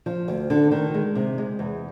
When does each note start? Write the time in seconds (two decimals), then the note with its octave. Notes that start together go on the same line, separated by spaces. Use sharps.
0.06 F3
0.28 D2
0.50 D3
0.71 D#3
0.94 G#3
1.15 C3
1.38 G#3
1.59 E2